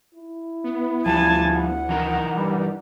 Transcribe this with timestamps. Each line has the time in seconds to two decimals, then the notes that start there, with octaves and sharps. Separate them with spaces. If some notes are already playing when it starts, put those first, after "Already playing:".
0.15 E4
0.64 B3
1.06 D2 F3 G3 B3 G#5 A5
1.53 F#5
1.89 E3 D#4 A#4
2.37 G2 G3